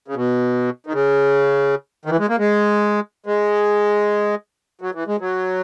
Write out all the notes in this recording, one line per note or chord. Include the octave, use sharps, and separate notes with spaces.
C#3
B2
D#3
C#3
D#3
E3
G#3
A#3
G#3
G#3
F#3
E3
G#3
F#3